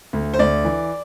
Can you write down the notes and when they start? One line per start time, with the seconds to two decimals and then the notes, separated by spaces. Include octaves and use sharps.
0.13 D2
0.34 C5
0.39 D2 D5
0.65 E3